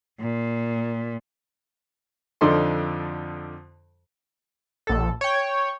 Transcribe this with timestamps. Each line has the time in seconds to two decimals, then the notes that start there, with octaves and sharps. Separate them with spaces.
0.20 A#2
2.41 F2 D3 F3 D#4 D5 C6
4.87 A#1 A4
5.21 C#5 G5